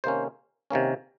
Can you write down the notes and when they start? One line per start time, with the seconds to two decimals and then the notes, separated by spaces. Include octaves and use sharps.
0.04 C3 D#3 A#3 C#4 C5
0.71 C3 D#3 A#3 C#4